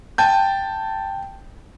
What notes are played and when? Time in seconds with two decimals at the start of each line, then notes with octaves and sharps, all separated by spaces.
0.18 G5 A5 G6